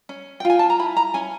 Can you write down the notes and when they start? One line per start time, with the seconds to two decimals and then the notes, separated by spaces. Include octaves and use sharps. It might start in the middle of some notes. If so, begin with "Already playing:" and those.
0.09 C#4
0.40 G5
0.45 F4 G#5
0.59 A5
0.70 A#5
0.79 E4 B5
0.96 A#5
1.14 C#4 G#5